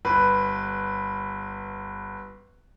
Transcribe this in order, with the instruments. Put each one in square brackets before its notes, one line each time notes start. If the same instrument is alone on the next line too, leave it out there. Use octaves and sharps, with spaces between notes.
[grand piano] G1 B4